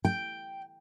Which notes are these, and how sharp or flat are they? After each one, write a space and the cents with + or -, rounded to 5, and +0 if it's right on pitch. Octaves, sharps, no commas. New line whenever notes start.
G5 +0